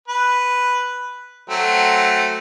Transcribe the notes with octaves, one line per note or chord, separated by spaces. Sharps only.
B4
F#3 A3 C4